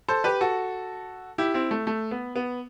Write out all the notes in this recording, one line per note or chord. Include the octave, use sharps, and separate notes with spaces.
A4 C5
G4 B4
F#4 A4
E4 G4
C4 E4
A3
A3
B3
B3